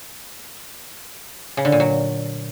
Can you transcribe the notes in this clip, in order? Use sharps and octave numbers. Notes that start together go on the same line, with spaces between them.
C#3
D3
A#2
F#3